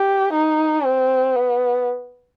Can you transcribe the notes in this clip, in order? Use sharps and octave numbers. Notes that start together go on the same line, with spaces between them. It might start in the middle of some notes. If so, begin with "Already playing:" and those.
Already playing: G4
D#4
C4
B3